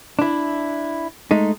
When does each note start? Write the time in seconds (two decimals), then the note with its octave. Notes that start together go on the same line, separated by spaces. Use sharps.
0.19 D4 E4
1.31 G#3 A3 D#4